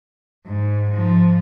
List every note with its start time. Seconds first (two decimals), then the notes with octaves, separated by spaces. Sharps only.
0.46 G#2
0.91 G#2 F3